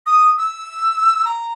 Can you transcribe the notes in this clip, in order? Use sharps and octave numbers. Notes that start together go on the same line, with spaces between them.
D#6
E6
A#5